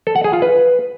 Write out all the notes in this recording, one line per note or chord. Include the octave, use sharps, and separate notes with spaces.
A4
F#5
G#4
F4
B4